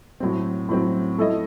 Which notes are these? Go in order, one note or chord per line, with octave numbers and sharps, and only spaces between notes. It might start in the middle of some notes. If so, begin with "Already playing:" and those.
A2 F#3 C4
A2 F#3 C4
A3 E4 A4 D#5